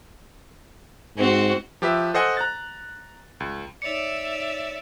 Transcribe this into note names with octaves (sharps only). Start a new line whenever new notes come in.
G#2 C4 F#4
F3 G4 B4 E5
A4 C5 D#5 F#5 G#5
A#5 F#6 A6
C#2
D#4 C#5 D5 E5 D6 C#7 F7